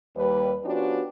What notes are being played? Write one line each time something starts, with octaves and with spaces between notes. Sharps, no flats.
D#2 G3 B4
F3 B3 C#4 D4 F#4 G4